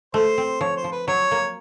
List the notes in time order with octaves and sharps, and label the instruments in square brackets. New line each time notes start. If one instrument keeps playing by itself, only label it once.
[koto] A3 [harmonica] C5
[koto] C4
[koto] F3 [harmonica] C#5
[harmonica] C5
[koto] F3
[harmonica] B4
[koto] F#3 [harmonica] C#5
[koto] A#3